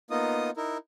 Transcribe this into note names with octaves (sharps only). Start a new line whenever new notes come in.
A#3 B3 D#4 F4 D#5 D#6
D#4 E4 A#4